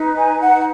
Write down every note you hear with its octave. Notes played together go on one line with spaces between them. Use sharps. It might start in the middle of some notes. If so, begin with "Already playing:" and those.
Already playing: D#4 B4
G#5
F#5